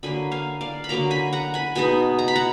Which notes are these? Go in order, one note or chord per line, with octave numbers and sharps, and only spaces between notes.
D3 F#3 A#3 G#5 B5
F5 G#5
D5 F5
B5
D3 F#3 A#3 A#5 D6
G#5 B5
F#5 A#5
G#5 B5
B2 G#3 B3 D#4 G#5 B5
A#5
B5
F#5 A#5